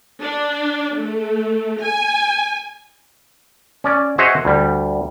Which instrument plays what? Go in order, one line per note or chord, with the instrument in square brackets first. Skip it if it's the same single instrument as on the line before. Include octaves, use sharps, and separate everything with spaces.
[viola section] D4
A3
G#5
[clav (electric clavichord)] C#4 D5
F#4 G#4 C5 C#5 D#5 E5
D2 G3